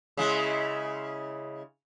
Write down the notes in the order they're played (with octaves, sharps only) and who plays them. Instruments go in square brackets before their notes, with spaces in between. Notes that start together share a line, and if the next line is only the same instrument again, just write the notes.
[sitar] C#3 G#3 E4